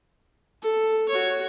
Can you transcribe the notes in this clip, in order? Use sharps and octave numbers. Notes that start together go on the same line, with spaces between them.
A4
F#4 C#5